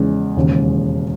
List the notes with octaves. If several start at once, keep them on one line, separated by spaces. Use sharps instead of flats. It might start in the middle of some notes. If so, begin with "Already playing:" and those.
Already playing: E2 C#3 F3 G#3 C#4
E1 D#2 C#3